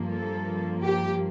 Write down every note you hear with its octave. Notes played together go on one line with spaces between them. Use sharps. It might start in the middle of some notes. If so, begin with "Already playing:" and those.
Already playing: G2 F3 A#3
A4
G4